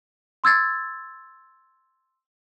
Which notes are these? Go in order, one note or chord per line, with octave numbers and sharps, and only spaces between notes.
C6 E6 G#6 A6